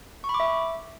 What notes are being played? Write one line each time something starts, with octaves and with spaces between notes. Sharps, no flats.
C#6
B5
D6
E5